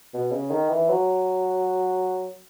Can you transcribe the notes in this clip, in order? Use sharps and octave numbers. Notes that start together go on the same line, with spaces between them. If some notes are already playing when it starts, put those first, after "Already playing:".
B2
C#3
D#3
E3
F#3